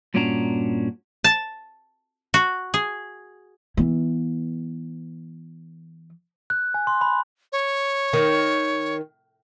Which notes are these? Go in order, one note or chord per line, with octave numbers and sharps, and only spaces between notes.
G2 A#2 C#4 D4 F#4 A#5
A5
F#4
G#4
E3 B3
F#6
G#5
C6
B5
C#5
D#3